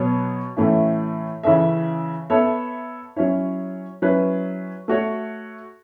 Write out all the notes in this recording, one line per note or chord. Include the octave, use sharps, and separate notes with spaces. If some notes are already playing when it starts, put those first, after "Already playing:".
Already playing: B2 F#3 B3 C#5
A2 E3 A3 C#4 E4
C#3 E3 C#4 A4 E5
B3 A4 C#5 E5
F#3 C#4 E4 C#5
F#3 C#4 E4 B4
A3 F#4 C#5